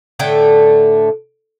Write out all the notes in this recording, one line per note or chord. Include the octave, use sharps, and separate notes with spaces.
A2 D3 A3 G5